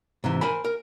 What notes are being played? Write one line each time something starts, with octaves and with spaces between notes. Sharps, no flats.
G#2 C3 E3
A#4 C5 G#5 B5
A#4